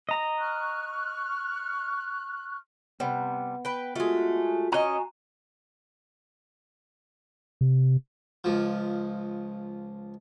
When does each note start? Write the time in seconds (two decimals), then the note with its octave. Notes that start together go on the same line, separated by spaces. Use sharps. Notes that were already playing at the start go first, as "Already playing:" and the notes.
0.09 D#5 A#5
0.38 C#6 F6 F#6
3.00 C3 G3 B3
3.65 B4 G5
3.96 G#3 A3 F4 F#4
4.72 C#4 F#4 D#5 G#5 A#5
7.61 C3
8.44 C#2 F3